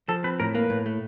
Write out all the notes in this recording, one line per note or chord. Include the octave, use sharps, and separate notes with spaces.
F3 A4
C4 B4
A2 A#4
A#3 B4
A2
A3